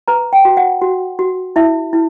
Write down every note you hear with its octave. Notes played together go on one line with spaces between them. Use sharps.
B4 A#5
G5
F#4
F#5
F#4
F#4
E4 E5
E4